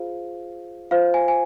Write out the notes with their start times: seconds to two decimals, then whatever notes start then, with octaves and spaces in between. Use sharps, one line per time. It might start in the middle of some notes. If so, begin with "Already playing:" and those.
Already playing: F4 G#4 C5 F5
0.91 F4 C5 F5
1.14 G#5
1.28 G#5